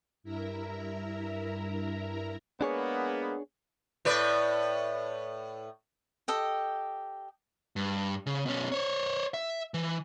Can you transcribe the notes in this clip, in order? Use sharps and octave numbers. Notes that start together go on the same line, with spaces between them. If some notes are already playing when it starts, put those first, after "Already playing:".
G2 E4 A#4 E5 A#5
G#3 A#3 B3 D4 G#4 C#5
A2 B4 D5
G4 A4 D#5 G5
G2
C#3
B2 C#4
C5 C#5
E5
E3